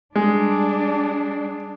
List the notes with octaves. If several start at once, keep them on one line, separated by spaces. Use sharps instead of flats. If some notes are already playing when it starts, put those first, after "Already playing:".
G3 G#3 D4